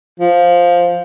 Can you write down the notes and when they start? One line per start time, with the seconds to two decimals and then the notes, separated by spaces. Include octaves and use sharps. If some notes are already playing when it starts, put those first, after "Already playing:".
0.20 F3